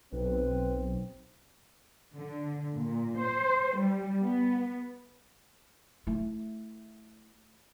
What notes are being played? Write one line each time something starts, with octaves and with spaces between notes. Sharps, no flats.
B1 C4 B4
D3
A#2
C5
G3
B3
A3 E4